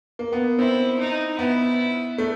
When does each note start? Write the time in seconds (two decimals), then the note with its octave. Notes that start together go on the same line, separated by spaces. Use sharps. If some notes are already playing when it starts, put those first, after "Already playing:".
0.19 A#3
0.32 B3
0.59 C4 E4
0.99 D#4
1.38 B3 E4
2.18 A3